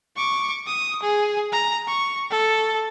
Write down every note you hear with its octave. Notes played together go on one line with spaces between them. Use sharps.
C#6 D6
D#6
G#4
A#5
C#6
A4